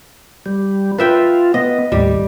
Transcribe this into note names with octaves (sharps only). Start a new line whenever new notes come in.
G3
F4 B4 E5 G5
B3 D#5
D#2 A2 G3